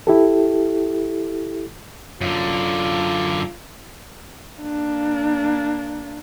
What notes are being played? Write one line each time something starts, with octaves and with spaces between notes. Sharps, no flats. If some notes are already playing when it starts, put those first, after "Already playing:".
E4 G4 A4
F#2 D3 F4
A#3 D4